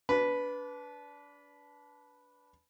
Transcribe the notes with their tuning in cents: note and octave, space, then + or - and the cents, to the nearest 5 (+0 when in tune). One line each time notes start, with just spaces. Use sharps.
D4 -25 B4 +0